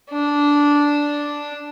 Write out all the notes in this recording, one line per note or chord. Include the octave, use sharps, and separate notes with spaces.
D4